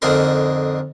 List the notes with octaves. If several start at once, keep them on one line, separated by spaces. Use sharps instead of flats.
F2 D3 D#4 G#4 A#4 C6